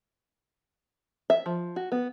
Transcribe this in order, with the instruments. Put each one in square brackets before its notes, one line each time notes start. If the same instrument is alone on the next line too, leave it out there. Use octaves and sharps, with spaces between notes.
[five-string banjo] E5
F3
F#4
B3